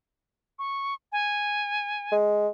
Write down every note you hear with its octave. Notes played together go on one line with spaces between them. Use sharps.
C#6
G#5
G#3